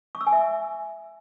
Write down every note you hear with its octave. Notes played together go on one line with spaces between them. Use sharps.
C#6
E6
G#5
E5